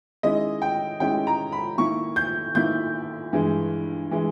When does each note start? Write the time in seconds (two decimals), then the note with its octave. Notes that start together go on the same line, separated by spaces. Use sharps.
0.23 D#3 G#3 C#4 E4 D#5
0.62 G5
1.00 D#3 G#3 C#4 E4 G5
1.27 A#5
1.52 B5
1.78 D#3 A#3 E4 C#6
2.16 G6
2.55 D#3 A#3 E4 G6
3.33 G2 E3 G#3
4.11 E3 G#3